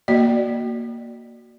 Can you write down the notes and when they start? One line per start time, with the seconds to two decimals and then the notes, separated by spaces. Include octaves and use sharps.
0.08 A#3 F#4 D5 D#5